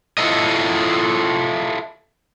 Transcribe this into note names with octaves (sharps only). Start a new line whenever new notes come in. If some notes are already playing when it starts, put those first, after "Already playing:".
E4 F4 A4 D#5